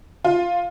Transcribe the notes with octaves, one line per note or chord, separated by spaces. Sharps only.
F4